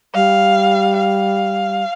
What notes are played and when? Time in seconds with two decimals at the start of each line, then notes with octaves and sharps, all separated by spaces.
0.14 G3 F5
0.97 F5